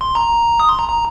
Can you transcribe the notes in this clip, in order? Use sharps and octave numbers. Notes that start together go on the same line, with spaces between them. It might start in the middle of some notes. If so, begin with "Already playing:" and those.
C6
A#5
D#6
C6
A#5
A#5